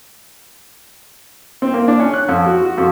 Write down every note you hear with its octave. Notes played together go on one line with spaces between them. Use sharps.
C4
A#3
D4
C#4
F#6
F2
F#4
F#4
F2